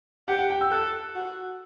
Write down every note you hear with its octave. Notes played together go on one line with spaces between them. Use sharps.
G4 F#5
F#5
G5
E6
A4 F#6
F#4